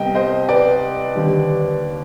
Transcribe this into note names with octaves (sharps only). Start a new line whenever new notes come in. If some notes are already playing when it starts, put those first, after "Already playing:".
Already playing: C2 C3 G3 B3 D#5 G5
C5 D#5
B4 D5
D#2 D3 G3